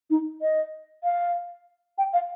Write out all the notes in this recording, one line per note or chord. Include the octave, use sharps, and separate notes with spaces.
D#4
D#5
F5
G5
F5